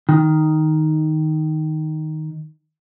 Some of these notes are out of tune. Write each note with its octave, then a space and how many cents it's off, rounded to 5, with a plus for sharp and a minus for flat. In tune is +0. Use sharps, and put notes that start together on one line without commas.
D#3 +0